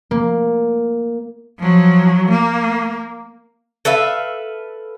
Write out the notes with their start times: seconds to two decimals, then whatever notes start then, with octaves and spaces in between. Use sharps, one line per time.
0.11 A#3
1.59 F3 F#3
2.31 A#3
3.85 A4 B4 E5 F5